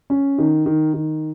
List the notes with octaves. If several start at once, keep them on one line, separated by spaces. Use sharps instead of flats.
C#4
D#3
D#3
D#3